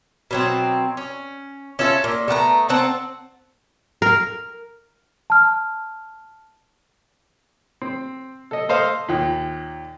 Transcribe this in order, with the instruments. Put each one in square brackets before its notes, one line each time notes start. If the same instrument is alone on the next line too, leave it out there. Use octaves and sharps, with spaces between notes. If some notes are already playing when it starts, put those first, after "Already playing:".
[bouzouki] B2 F#3 C4
C#4
C#4 E4 F4 A4
A#2
A3 B3 F#5 A#5
C4 F#5 A5
[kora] A#4
[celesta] A5 F6
[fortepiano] C4
A4 D#5
A4 C5 D#5 F5
D#2 A#2